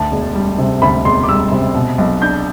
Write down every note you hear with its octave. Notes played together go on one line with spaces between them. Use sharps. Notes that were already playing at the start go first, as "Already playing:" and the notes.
Already playing: D2 A5
E1
G3
C3
D2 B5
E1 C6
D6
G3 E6
C3
B2
B1
D4 G6